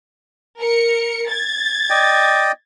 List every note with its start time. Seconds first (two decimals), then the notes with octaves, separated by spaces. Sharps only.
0.58 A#4 C#7
1.26 G#6 A6
1.90 D5 D#5 G5